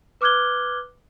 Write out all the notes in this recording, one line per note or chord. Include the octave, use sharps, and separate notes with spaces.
B4 D6 F6 F#6 G#6 G7